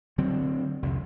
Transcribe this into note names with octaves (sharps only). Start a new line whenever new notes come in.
D3 F#3 C4
C2 F2